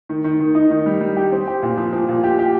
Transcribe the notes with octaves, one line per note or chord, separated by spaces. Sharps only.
D#3
D#3
D#3
D#4
D#3
G3
G3
G4
C4
G4
A#2
F3
F3
A#2
G4
G4